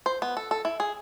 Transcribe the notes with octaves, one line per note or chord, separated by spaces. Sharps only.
C5
B3
A4
A4
E4
G#4